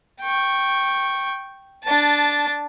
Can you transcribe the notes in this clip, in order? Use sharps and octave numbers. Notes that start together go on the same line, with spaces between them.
G5 C#6
D4 A5